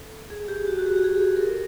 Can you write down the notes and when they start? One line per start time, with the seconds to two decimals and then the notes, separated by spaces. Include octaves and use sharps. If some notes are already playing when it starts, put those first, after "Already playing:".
Already playing: A4
0.30 G#4
0.48 G4
0.67 F#4
0.79 F#4
0.86 G4
0.96 G4
1.04 G#4
1.22 G#4
1.36 A#4
1.41 A4